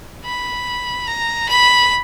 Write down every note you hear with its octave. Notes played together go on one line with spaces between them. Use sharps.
B5
A#5
B5